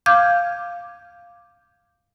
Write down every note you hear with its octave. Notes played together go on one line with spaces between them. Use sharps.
F5 D6 F6 G6 G#6